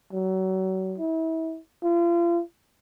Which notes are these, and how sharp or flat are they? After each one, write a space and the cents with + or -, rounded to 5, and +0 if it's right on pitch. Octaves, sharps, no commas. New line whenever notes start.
F#3 +30
E4 -30
F4 -35